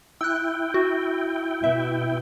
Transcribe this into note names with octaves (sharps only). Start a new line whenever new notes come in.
E4 G5 E6 F#6
F#4
B2 E5